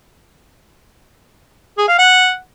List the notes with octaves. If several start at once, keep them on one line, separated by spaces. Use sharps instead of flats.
G#4
F5
F#5